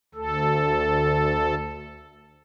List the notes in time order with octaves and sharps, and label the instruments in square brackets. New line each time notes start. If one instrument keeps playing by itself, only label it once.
[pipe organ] D2 A4